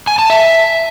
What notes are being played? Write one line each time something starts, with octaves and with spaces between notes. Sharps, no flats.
G#5
A5
E5